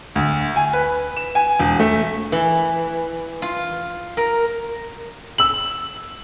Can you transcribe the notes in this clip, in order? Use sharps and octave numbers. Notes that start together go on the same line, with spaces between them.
D2
G#5
B4
E7
G#5
E1
A3
E3
F4
A#4
E6 F#7